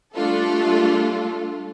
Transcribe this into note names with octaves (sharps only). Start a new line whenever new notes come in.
G3 A3 D4 F4 A4